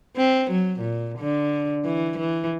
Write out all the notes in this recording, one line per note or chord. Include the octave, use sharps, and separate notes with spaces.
C4
F#3
A#2
D3
E3
E3